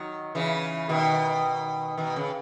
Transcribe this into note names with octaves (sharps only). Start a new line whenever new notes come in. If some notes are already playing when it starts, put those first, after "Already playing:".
Already playing: D#3 F#3
C#3 E3
B2 D#3
B2 D#3
C#3